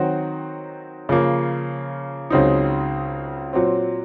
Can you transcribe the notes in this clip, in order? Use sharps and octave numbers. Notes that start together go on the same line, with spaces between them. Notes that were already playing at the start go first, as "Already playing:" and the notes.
Already playing: D#3 F#3 C4 F#4
C#3 F3 A#3
C#2 C#3 F#3 C4 D#4
A#2 F#3 C4